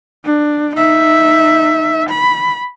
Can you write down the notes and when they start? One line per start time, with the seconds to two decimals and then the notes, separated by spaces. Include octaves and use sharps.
0.25 D4
0.76 D#4 E5
2.10 B5